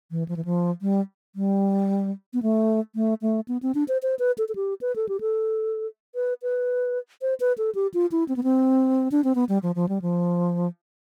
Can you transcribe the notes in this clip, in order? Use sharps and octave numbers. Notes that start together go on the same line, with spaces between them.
E3
F3
E3
F3
G3
G3
B3
A3
A3
A3
B3
C4
D4
C5
C5
B4
A4
A4
G4
B4
A4
G4
A4
B4
B4
C5
B4
A4
G4
F4
E4
C4
B3
C4
D4
C4
B3
G3
F3
F3
G3
F3